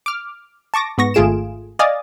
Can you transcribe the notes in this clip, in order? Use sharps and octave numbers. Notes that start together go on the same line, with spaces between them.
D6 F6
A5 C#6 D6 A#6
G#2 B3 C#6 A#6
G#1 A3 F4 G#4 D7 E7
D5 D#5 F5 G#5 D#6 A6